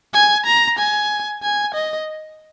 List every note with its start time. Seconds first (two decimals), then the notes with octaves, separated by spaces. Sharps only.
0.14 G#5
0.46 A#5
0.78 G#5
1.43 G#5
1.74 D#5